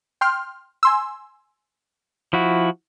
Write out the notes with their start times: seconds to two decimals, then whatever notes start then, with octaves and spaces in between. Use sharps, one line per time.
0.21 G5 C6 F6
0.83 G#5 C6 E6
2.33 F3 E4 F#4